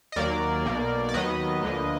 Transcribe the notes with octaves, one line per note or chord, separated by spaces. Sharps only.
D#5
D#2 D#3 F#3 A#3 A#4 D5
B1 B2 A#3
D5
D#2 D#3 F#3 B3 B4 D#5
D2 D3 F3 A#3